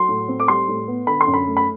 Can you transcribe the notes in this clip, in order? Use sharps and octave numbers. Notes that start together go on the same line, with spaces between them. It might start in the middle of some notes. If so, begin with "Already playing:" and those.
Already playing: F#3 C6
A2
C4
D6
G3 C6
A2
B3
D3 B5
C6
F#2
B5
A3
B5